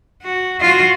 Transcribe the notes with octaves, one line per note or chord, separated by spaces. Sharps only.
F#4
F4 F#4